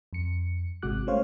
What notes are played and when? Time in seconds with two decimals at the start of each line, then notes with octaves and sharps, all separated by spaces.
0.13 F2 C#7
0.82 G#1 C3 G#3 F#4 D6 F#6
1.07 G#3 A3 C#4 C5 C#5 F5